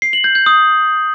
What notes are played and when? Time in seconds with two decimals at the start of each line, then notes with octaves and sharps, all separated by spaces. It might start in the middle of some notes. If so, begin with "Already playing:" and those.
0.02 C7
0.13 F#7
0.24 G6
0.35 G6
0.46 D#6